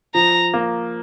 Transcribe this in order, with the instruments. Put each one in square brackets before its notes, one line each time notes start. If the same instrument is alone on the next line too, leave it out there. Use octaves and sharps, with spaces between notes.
[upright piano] F3 [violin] A#5
[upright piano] A#3